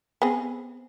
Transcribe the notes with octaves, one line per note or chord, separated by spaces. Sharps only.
B3 C4 G#4